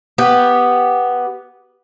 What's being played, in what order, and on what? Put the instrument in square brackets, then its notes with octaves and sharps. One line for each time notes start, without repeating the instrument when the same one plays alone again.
[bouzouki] B3 G4